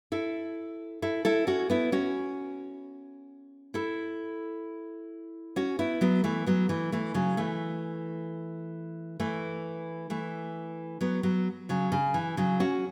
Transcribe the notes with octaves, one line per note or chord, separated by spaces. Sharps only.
E4 A4
E4 A4
E4 A4
C#4 F#4
B3 E4
C#4 F#4
E4 A4
C#4 F#4
B3 E4
F#3 B3
E3 A3
F#3 B3
E3 A3
E3 A3
C#3 F#3
E3 A3
E3 A3
E3 A3
F#3 B3
F#3 B3
C#3 F#3
C#3
E3
C#3 F#3
C#4 F#4